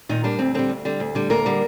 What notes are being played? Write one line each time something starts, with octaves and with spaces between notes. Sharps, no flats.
A#2 D#3 D#4
G3 A#3 D4
D2 C4
D3 G3 C4
D2
D3 G3
D2
D3 G3
D2 A#3 A#4
D3 G3